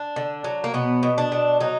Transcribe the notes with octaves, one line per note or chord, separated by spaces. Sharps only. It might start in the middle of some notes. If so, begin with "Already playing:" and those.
Already playing: D4
D3
F#3
A#3
B2 B3
B2
D4
B2
F#3 D#4